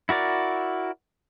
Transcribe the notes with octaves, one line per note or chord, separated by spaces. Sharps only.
E4 F#4 A#4 D5